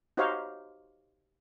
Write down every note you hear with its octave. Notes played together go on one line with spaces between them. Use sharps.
D#4 F#4 G4 C5 C#5 F5